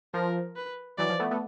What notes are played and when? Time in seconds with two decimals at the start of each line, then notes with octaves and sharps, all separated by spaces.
0.14 F3 A#4
0.57 B4
0.98 E3 F#3 D5
1.09 F3
1.19 A3 B3
1.31 A3 B3